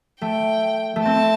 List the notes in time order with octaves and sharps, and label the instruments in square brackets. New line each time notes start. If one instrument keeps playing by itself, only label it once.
[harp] A3 [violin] G5
[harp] A3
[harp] C4 [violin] A5